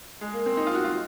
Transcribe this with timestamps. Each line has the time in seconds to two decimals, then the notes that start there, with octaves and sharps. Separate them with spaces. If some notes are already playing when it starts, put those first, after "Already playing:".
0.21 G#3
0.34 A#3
0.46 C4
0.57 D#4
0.67 F4
0.75 F#4
0.84 F4